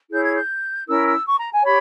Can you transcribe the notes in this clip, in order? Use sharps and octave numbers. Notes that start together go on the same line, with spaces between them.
E4 G#4 C#5 G6
G#6
G6
C#4 E4 A#4 E6
E6
C#6
A#5
G#5
G4 C#5 B5